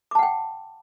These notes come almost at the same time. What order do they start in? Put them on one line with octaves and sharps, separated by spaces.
D6 A5 F#5 G5